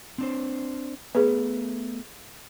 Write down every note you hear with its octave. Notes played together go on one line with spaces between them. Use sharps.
C4 D4 C5
A3 B3 G#4 B4